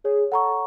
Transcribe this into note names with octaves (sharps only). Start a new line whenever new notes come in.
G#4 C#5
A4 F#5 A#5 C#6